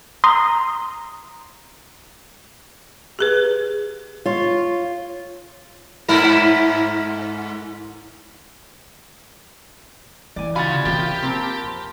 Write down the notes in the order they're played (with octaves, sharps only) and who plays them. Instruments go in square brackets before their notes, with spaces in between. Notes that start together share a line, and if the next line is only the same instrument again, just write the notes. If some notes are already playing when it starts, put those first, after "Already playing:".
[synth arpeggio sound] A#5 C6 D#6
[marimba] G4 G#4 B4
[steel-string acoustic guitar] F4 C#5
[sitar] G#2 E4 A#4
[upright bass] E3 [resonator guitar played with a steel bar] D5 G#5
[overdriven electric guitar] C#3 F5 [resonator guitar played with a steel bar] F4 F#4 G#5 [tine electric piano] B5 F6 A6
[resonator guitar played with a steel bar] C3 F3 A#3 [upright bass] F4 [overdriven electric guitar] G4
[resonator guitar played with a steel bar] F3 A#3 C4